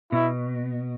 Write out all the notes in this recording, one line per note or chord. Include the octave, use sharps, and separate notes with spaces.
B2 E4